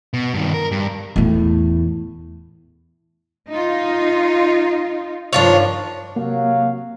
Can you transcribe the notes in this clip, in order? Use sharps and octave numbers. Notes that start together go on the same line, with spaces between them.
B2
G2 D#3
A#4
G2
E2 A2
D#4 F4
G2 D#3 F3 D4 F4 C#5
C3 F#3 A#3 F5